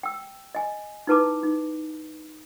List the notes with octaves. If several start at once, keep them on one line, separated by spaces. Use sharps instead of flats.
G5 E6
D#5 G#5
D#4 E4 B4 A5 A#5 D6
D#4